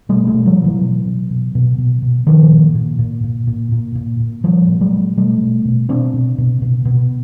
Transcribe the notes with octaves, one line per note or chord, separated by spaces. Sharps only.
B2 G3 A3
G3 A3
B2
F3 G3
B2
E3 F#3
B2
B2
B2
B2
B2
B2
A#2 D#3 F3
A#2
A#2
A#2
A#2
A#2
A#2
A#2
A#2
A#2 F3 G3
A#2
F#3 G#3
A#2
B2 G3 A3
B2
B2
B2 C4 D4
B2
B2
B2
B2